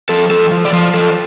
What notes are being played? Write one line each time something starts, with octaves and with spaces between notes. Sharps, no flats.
F3 A4
F3 A4
F3
D5
F3 C5
F3 A4